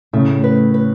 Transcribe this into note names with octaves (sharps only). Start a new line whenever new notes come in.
A2 C#3 A3
B4
B4